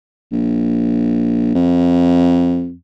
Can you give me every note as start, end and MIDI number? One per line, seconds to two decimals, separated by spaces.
0.32 1.52 34
1.55 2.73 41